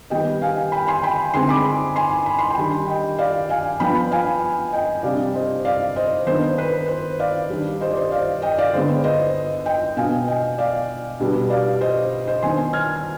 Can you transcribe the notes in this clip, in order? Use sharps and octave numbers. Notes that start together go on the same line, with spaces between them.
D#3 G3 B3 D#5 G5
F5 G#5
G5 B5
G#5 C6
G5 B5
D3 G#3 C4 D#4 G#5 C6
B5 D6
G#5 C6
B5
C6
G5 B5
D#3 G3 D4
D#5 G5
D5 F5
F5 G#5
F3 B3 D4 G5 B5
F5 G#5
D#5 G5
C3 G3 D4 D5 F5
C5 D#5
D5 F5
C5 D#5
D#3 B3 D4 C5
B4
C5
D5 F5
D#3 G3 D4
C5 D#5
D5
C5 D#5
D5 F5
D#5 G5
D5 F5
D3 G#3 B3 C5
C5 D#5
D#5 G5
B2 B3 D4 F5 G#5
D#5 G5
D5 F5
B2 G3 B3 D4
D5 F5
C5 D#5
C5 D#5
D#3 B3 D4 G#5 C6
F6 G#6